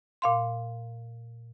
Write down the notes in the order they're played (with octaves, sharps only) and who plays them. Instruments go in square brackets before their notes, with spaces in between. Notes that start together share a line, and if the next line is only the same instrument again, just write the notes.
[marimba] A#2 F5 C6